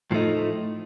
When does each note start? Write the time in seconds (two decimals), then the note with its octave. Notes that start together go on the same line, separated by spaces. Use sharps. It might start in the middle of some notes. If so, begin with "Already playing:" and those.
0.11 A2 F3 A3 D#4